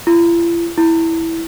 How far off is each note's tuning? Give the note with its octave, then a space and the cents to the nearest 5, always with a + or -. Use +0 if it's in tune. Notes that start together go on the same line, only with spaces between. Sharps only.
E4 +45
E4 -5